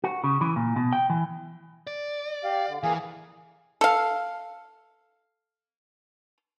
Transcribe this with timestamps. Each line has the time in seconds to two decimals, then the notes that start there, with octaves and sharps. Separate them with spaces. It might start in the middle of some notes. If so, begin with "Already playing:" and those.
0.04 F#4
0.24 C#3
0.41 E3
0.56 A#2
0.76 B2
0.93 G5
1.10 E3
1.87 D5
2.44 G4 F5
2.68 D3
2.83 E3 A#3 G#4 F5
3.81 A4 F5